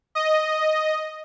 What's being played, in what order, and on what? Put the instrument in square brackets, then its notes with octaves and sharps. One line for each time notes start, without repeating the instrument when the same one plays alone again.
[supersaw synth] D#5